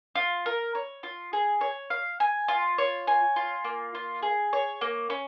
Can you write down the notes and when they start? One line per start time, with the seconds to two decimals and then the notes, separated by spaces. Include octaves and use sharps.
0.15 F4
0.46 A#4
0.75 C#5
1.03 F4
1.33 G#4
1.61 C#5
1.90 F5
2.20 G#5
2.48 F4
2.78 C#5
3.07 G#5
3.36 F4
3.64 A#3
3.95 F4
4.23 G#4
4.53 C#5
4.81 A#3
5.10 C#4